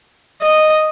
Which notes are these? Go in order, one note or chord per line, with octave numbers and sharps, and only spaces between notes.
D#5